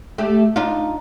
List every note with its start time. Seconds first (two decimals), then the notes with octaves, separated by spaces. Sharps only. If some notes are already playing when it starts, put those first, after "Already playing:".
0.18 A3 G4
0.56 D4 D#4 F4